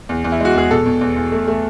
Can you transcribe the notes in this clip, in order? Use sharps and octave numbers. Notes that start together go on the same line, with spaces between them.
E2
E2
E4
G#3 F#4
E2 G#4
B2 A4
B2
E2
E2
A3
A3